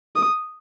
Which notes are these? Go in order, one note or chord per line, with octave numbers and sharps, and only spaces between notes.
D#6